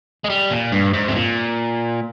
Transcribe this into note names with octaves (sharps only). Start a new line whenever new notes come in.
G#3
G3
A#2
G2
G#2
C3
A#2